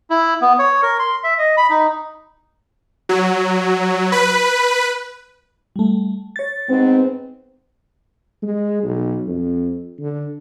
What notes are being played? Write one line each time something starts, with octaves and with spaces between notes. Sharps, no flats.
E4
B3
C#5
A#4
C6
E5
D#5
B5
D#4
F#3
B4
G3 A3
C#5 A6
G#2 B3 C4
G#3
B1
F2
D3